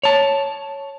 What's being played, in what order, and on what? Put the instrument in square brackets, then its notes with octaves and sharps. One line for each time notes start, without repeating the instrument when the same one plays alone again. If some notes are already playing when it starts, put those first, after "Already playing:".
[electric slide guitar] C#5 A5